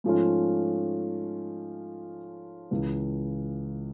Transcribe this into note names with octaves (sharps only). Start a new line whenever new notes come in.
G#2 F3 A3 C#4 F4
C#2 C#3 E3